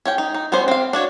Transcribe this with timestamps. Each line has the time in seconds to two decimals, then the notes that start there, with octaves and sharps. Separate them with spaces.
0.05 C#4 C#5 G5
0.18 D#4
0.34 D#4
0.52 G3 B3 C#4 C5
0.68 C4 F5
0.93 D4 F#4 C#5